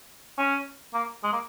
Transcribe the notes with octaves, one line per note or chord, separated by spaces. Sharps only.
C#4
A#3
G#3
A#3